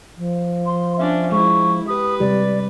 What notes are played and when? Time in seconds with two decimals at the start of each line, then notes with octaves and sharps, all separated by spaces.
0.17 F3
0.66 C6
0.97 C#4 D4 E5
1.32 G#3 E4 C#6
1.88 G4 B4 D#6
2.20 C3 G3 D5